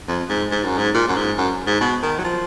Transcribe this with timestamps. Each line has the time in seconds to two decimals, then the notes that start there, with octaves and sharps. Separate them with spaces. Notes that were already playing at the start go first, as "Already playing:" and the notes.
0.08 F2
0.29 G#2
0.51 G#2
0.64 F#2
0.78 G#2
0.95 A#2
1.08 F#2
1.16 G#2
1.38 F#2
1.67 G#2
1.81 B2
2.03 D#3
2.19 F#3
2.25 F3